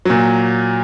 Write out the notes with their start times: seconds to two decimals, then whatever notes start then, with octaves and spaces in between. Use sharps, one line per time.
0.05 A#2 F#3